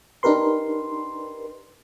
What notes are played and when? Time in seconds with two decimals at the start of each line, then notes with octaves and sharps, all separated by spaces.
0.23 D4 D#4 G4 A#4 B4 C6